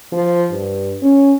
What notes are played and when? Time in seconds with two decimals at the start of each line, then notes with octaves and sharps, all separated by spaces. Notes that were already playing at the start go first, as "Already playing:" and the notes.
0.12 F3
0.51 G2
1.02 C#4